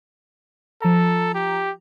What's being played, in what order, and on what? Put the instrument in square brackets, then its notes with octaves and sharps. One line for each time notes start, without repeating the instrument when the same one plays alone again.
[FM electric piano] F3 A#5 [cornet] A4
[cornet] G4